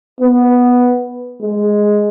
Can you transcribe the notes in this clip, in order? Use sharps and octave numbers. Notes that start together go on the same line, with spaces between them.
B3
G#3